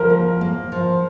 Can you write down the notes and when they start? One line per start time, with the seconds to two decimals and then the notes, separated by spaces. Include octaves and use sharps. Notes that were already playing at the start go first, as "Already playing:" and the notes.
Already playing: F3 A#4
0.10 A#3
0.41 A#3
0.72 F3